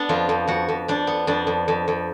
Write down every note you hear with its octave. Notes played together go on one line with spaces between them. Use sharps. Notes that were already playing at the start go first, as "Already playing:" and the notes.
Already playing: B3 D4
F2 F4
F2
F2 F#4
F2
F2 D4
B3
F2 D4
F2
F2
F2